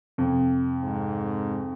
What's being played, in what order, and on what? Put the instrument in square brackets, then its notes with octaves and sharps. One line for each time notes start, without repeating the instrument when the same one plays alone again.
[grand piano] F2 [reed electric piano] C3
[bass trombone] G#2